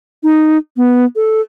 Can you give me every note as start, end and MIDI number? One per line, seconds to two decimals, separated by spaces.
0.23 0.58 63
0.77 1.05 59
1.16 1.41 69